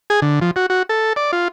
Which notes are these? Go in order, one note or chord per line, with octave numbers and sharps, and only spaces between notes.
G#4
D3
F3
F#4
F#4
A4
D5
F4